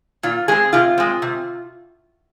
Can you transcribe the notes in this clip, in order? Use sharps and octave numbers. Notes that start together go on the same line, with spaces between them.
A#2 F4
G#3 C4 G#4
C3 F4
G#3 C4
C3